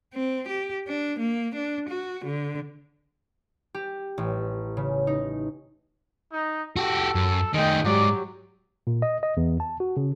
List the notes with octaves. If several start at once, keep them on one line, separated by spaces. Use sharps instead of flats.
C4
G4
D4
A#3
D4
F#4
D3
G4
A1
C#3
D#4
D#4
F#4 G4 A4
F#2
D#3 G#3 A3 D#5 G5
G#2 F#3 G4 D5
A#2
D#5
D#5
E2
A5
F#4
C#3